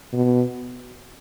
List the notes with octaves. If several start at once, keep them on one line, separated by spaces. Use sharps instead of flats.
B2